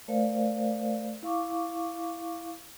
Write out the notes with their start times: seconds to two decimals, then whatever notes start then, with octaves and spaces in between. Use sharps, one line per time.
0.08 A3 A#4 C5 D5 F5
1.23 E4 F5 C#6 D6